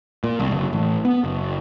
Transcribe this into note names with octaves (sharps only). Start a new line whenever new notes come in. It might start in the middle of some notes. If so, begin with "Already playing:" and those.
A#2
C2
F#1
A1
B3
F#1